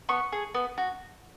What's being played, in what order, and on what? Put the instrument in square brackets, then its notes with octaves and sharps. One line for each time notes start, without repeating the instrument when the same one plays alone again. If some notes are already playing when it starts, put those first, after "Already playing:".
[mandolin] B3 C#6
G#4
B3
F#4